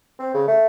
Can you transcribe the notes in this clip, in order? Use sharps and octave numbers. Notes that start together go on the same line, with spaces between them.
C4
C#3
A3